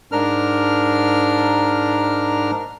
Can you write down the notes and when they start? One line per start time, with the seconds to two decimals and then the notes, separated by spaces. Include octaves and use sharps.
0.12 G#2 D4 A#4 F6